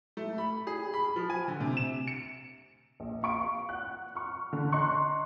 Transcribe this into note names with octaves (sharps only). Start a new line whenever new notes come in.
A3
B5
G#4
B5
F3
G#5
D3
C3
E7
C#7
A#1
F5 C#6 D7
F#5 F#6
C#6 F6
D3
D#5 A#5 C6 C#6 F#6